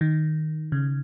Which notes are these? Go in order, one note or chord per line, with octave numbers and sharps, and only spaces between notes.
D#3
C#3